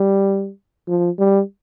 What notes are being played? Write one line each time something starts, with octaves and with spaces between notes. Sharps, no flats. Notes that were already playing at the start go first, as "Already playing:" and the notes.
Already playing: G3
F3
G3